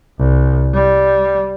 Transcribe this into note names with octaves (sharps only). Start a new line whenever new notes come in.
C2
G3